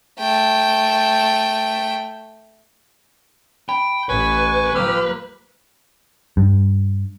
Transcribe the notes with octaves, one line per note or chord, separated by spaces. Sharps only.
A3 G5
G5 B5
A1 B4 G#5 C#6
F3 A#3 G4 E6 F6
G2